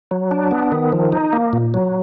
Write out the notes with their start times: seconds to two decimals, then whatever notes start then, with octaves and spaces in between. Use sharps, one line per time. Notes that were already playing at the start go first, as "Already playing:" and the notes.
0.11 F#3
0.31 D4
0.51 B3
0.72 D#3
0.92 F3
1.12 D#4
1.33 A#3
1.53 A#2
1.74 F#3